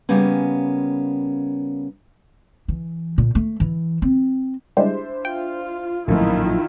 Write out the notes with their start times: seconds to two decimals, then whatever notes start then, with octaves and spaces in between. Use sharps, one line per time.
0.09 C#3 G3 A#3 B3 C#4
2.68 E3
3.18 A#2
3.35 A3
3.60 E3
4.02 C4
4.77 G3 G#3 D4 E4 C5
5.25 F4 G5
6.08 A#1 F#2 A2 D#3 F3 F#3 E4 F4